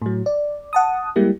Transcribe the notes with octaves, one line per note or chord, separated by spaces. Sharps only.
A2 F#3
D5
F#5 A5 D#6
G3 G#3 A#3 E4 G4